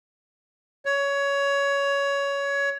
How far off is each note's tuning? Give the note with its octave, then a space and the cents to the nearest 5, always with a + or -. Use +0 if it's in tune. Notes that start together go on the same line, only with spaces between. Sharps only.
C#5 +15